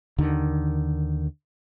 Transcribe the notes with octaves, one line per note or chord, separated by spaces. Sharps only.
D#2 D3 D#3